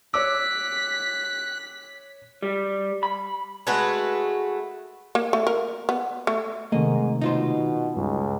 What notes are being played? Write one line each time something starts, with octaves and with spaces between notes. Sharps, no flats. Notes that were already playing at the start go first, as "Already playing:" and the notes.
C#5 D6 E6 F#6 B6
G3
B5
G#3 A3 F#4 B4
A#3
A3
A#4
B3
A3
G#2 C3 D#3 A3 A#3 D#5
B2 D#4 F4 C5
C#2 G2 G3